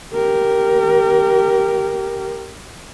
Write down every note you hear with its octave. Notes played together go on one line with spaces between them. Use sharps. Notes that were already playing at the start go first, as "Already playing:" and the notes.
G4 A#4